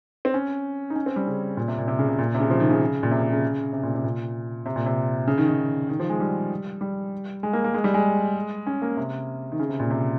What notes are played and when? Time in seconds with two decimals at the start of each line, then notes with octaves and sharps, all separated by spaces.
0.25 C4
0.34 C#4
0.90 D#4
0.96 C#4
1.06 C4
1.16 G3
1.27 C#3
1.57 A#2
1.68 C3
1.78 A#2
1.88 C3
1.99 C#3
2.09 C3
2.19 A#2
2.35 C3
2.40 C#3
2.50 F3
2.60 D#3
2.70 C#3
3.03 A#2
3.11 C3
3.21 C3
3.33 C#3
3.73 C3
3.83 A#2
3.94 C3
4.04 A#2
4.66 C3
4.76 A#2
4.86 C3
5.27 C#3
5.38 D#3
5.48 D#3
5.89 D#3
6.00 F3
6.09 G#3
6.20 G3
6.81 G3
7.43 G#3
7.53 A#3
7.64 A#3
7.74 G#3
7.84 G3
7.94 G#3
8.67 C#4
8.82 A#3
8.97 C3
9.52 D#3
9.59 C#3
9.69 C3
9.80 A#2
9.90 C3